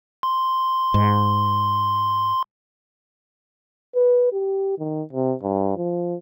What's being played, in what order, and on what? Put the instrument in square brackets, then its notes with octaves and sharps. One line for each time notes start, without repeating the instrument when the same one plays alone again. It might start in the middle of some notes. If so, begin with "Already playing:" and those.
[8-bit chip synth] C6
[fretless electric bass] G#2
[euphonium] B4
G4
D#3
C3
G2
F3